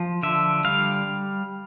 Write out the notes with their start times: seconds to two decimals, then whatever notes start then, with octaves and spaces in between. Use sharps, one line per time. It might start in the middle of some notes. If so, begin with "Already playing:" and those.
Already playing: F3
0.23 D3 E5
0.65 G3 F5